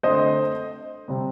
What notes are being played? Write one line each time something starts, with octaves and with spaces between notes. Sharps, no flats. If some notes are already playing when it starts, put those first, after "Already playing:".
D3 A3 C4 C5 D#5
C3 G3 C4